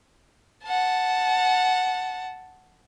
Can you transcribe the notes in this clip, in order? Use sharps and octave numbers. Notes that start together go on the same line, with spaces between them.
F#5 A5